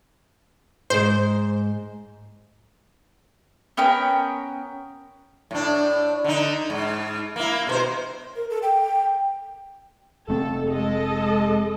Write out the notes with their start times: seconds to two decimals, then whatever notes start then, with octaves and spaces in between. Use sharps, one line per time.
0.90 G#2 G#3 C5
3.77 B3 C#4 A#4 G5
5.51 A2 D4
6.24 D3 D#4
6.70 G#2
7.36 A#3 E4
7.67 B2 A#4 C5
8.36 A#4
8.50 A4
8.62 G5
10.29 F1 A3 C4 A4
10.70 G#3 A4 D#5